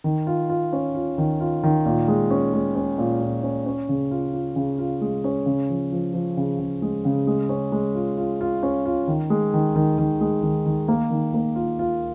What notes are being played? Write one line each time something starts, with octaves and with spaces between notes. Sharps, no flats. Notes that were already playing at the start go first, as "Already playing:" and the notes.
D#3
F4
F4
C#4
F4
D#3
F4
D#3
A#2
G#3
C#4
G#3
C#4
A#2
A#2
C#4
C#4
C#3
F4
F4
C#3
F4
G#3
C#4
C#3
F3
F3
F3
C#3
C#3
G#3
C#3
G#3
C#4
G#3
F4
F4
F4
C#4
F4
D#3
G#3
D#3
D#3
D#3
G#3
D#3
D#3
A#3
D#3
A#3
F4
F4